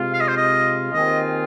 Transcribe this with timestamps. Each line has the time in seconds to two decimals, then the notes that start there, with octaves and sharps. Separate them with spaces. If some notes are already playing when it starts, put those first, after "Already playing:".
Already playing: C3 G#3 F4
0.13 F5
0.21 D#5
0.28 C5
0.37 D#5
0.93 D#2 D#3 C4 F4 G#4 D#5